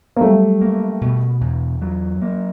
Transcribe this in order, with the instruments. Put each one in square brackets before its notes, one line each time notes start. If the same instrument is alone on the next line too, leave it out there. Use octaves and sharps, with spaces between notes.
[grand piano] A#3
[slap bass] F#3 [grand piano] G3 A3
[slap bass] A#3
B2
E2
F#3
A#3